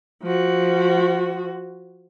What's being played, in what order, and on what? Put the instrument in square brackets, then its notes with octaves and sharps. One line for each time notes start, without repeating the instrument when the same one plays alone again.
[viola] F3 F#4